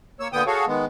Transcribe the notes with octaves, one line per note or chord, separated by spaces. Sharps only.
A#3 C#5 E6
A#2 D3 B3 G5 D#6
F#4 G#4 A4 C#5 F5
D#3 G#3 B3